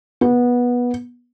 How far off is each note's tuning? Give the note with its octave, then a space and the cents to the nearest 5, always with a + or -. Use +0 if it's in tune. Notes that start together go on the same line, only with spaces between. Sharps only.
B3 -15